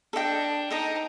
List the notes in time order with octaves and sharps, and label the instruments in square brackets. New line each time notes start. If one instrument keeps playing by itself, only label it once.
[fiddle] D4 [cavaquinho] A4 D#5 G5
[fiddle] D#4 [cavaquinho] A4 D#5 G5